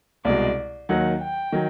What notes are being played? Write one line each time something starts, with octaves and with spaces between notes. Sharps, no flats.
C2 B2 G#3 D5
D#2 D#3 F#3 F#5
G5
D#3 F#3